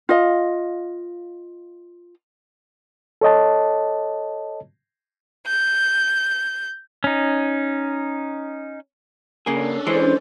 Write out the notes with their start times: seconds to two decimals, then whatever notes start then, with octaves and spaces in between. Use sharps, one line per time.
0.09 F4 D#5 F5
3.21 A4 C#5 D#5 A5
5.47 G6
7.04 C#4 D#4
9.46 C#3 A#3 C#4 D4 G#4 A4
9.87 E3 G#3 C5